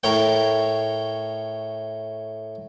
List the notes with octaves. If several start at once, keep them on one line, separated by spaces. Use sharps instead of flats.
A2 A#4 C#5 G5